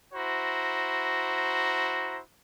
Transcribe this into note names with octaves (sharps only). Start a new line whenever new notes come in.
E4 F#4 C5 A#5